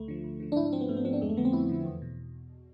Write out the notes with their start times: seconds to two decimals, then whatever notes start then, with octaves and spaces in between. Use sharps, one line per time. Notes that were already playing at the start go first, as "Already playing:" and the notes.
Already playing: D2 A3
0.08 D3 F3
0.24 D2
0.40 D3 F3
0.52 D4
0.56 G#2 E4
0.65 D4
0.73 F3 C4
0.81 B3
0.89 G#2 A3
0.97 B3
1.05 F3 C4
1.13 D4
1.21 F2 G#3
1.29 A3
1.37 D3 F3 B3
1.45 C4
1.53 F2 E4
1.69 D3 F3
1.85 E2
2.02 B2